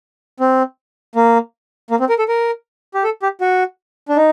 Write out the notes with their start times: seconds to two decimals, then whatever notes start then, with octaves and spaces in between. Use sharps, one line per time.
0.40 C4
1.15 A#3
1.91 A#3
2.00 C4
2.09 A#4
2.19 A4
2.28 A#4
2.94 G4
3.04 A4
3.22 G4
3.41 F#4
4.09 D4
4.17 D#4